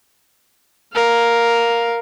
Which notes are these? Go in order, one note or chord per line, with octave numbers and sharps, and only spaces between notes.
A#4 F5